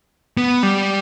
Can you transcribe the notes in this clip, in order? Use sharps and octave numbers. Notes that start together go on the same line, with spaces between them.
B3
G3